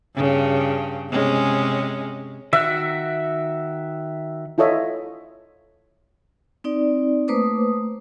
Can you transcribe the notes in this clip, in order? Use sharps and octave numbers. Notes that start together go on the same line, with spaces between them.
G2 C#3
C3 G#3 C#4
D#3 F#4 E5 F#6
E4 F4 A4 C#5 D#5 E5
C4 D#4 D5
A3 A#3 B4 C5 D6 D#6